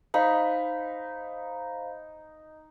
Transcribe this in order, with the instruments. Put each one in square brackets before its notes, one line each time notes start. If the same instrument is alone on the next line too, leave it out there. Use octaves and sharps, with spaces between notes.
[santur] D#4 D#5 [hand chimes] C5 F5 B5